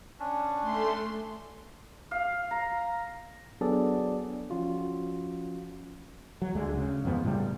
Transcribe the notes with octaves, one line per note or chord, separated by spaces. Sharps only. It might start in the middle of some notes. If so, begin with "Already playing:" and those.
C#4 D4
A3 C6
F5
A#5
F#3 B3 D4 G#4 A4 D5
F3 C#4 F4 F#4
F#3
D2 D3 G#3
C#3
F2 G#2 F3 B3
A2 C#3 G3